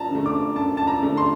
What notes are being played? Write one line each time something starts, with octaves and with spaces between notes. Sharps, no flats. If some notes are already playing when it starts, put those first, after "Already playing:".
Already playing: F#2 A5 A#5
D3 A3
D6
F#2 A5
A5
A#5
D3 A3
C6